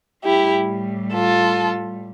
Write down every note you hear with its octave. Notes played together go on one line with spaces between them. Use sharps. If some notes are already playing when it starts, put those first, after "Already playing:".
A2 G3 E4 G4
F4 A4